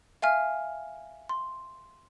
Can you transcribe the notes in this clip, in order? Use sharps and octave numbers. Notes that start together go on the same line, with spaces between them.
E5 F5 G#5 F6
C6